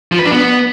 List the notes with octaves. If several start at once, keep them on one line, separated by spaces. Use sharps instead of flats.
F3
B4
D4
B3